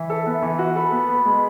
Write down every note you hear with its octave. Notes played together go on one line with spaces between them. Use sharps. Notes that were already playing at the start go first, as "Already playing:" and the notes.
Already playing: E3 E5
A4
B3
E3
F#4
A4 B5
B3
B3
G#3